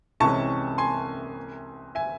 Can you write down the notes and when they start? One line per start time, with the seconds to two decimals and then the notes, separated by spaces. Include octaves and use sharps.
0.20 C2 C3 E3 G#3 C#4 A5 C#6
0.78 G#5 C6
1.95 E5 G#5